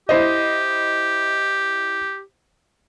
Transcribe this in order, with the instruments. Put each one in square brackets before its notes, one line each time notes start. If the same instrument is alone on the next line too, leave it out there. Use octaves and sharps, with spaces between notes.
[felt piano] E4 C5 D#5 [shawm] G4